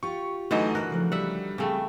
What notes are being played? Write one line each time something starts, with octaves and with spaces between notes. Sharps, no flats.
F4 G4 C#6
D3 E3 F#3 A3 D#4 D#5
A4 A#4 D5 D#5 F#6
C#3 F3 A3
G3 E5 F#5
C#3 A3 C4 G5